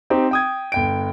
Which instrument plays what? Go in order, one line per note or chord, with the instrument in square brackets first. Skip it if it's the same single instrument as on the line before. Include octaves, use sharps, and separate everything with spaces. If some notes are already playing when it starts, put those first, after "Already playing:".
[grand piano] C4 D#4 G4
G5 D#6 G#6
G1 G5 D7